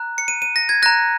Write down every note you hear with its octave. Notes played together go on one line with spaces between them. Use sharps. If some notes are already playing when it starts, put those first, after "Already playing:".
Already playing: A#5 F#6
C#7
D#7
D#7
A#6
G#6
A#5 F#6 A#6